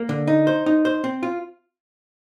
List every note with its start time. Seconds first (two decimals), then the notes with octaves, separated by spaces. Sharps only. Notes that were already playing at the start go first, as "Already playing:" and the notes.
Already playing: A#3
0.09 D3
0.27 D#4
0.47 C5
0.66 D#4
0.85 C5
1.04 C4
1.23 F4